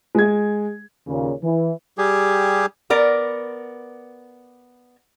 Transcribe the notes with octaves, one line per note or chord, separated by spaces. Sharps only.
G#3 G#6
D#2 A#2 C#3
E3
G3 G4 G#4
B3 A#4 D5